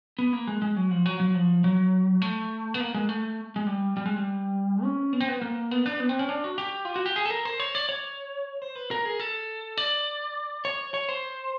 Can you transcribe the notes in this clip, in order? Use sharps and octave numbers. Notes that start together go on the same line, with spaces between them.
B3
A#3
G#3
G#3
F#3
F3
F#3
F#3
F3
F#3
A3
B3
A#3
G#3
A3
G#3
G3
G3
G#3
G3
C#4
B3
C4
B3
A#3
B3
D4
B3
C4
C#4
D4
F#4
G4
F4
F#4
G4
G#4
A4
A#4
C5
C#5
D5
C#5
C5
B4
A#4
G#4
A4
D5
C#5
C#5
C5